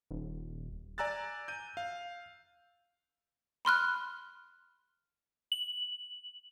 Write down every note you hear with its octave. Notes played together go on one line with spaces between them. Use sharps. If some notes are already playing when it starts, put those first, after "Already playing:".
D#1
D5 G#5 A#5 E6 F#6 A6
G6 D#7
F5
B5 C6 F6 F#6
F#7